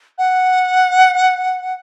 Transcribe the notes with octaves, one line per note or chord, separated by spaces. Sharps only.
F#5